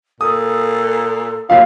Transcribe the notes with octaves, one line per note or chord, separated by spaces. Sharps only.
A#2 A4 D#6
D#2 F#3 E4 F4 F5